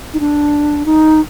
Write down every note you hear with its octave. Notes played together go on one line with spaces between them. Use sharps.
D#4
D4
D#4